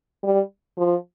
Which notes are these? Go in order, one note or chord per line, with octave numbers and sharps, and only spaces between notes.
G3
F3